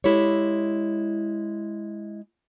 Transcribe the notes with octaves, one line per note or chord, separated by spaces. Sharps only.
G#3 E4 G4 A4 C#5